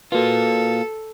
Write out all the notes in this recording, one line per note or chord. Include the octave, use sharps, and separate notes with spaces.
A#3 F4 F#4 A4 B4